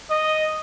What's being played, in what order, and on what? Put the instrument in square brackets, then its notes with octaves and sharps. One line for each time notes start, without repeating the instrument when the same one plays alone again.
[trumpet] D#5